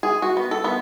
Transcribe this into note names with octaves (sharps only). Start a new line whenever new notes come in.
G#4
F#4
B3
A4
B3